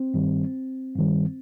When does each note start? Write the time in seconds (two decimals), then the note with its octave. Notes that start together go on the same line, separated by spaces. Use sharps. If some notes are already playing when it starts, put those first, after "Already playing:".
Already playing: C4
0.14 G2 D#3 G3
0.96 G2 D#3 G3